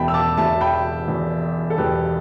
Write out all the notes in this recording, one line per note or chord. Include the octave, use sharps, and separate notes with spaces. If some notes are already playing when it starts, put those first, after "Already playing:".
Already playing: E1 E2 B2 E5 G5 A5 B5
E6
A5 D6
E1 E2 B2 E5 A5
G5 B5
E1 E2 B2
A4
E1 E2 B2 G4 B4